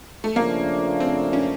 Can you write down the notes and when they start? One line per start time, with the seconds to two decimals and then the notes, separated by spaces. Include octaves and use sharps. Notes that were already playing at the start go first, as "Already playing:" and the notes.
0.24 A3
0.36 C#3 F3 A3 A#3 D4
1.00 C4
1.33 C#4